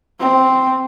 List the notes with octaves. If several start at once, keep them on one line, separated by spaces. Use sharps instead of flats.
C4